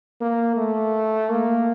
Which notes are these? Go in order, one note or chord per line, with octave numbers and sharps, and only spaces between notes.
A#3
A3
A#3